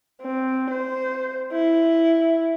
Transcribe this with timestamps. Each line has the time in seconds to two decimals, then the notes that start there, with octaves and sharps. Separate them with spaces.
0.22 C4
0.70 C5
1.52 E4